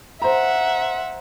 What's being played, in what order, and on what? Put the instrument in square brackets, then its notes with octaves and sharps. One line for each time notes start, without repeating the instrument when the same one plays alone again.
[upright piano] C5 A#5 [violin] E5 F#5